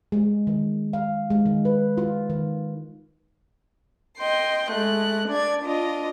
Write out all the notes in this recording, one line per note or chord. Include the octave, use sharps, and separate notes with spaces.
G#3
D#3
F5
G#3
D#3
B4
F4
D#3
D#5 G5 C6
G#3 A3 F#6
D4 D5 G#6
D4 F4 D#5